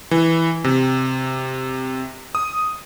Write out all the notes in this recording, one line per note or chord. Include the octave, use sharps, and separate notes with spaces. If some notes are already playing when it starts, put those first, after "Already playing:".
E3
C3
D#6